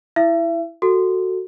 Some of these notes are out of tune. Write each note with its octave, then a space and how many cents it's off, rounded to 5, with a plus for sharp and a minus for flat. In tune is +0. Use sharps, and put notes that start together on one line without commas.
E4 +0 E5 +35
F#4 +5 A4 +20